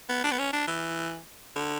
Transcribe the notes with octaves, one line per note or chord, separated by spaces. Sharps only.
B3
D4
B3
C#4
D4
E3
D3